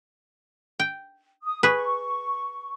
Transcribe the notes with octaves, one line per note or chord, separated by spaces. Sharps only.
G5
D#6
G#4 B4 C#6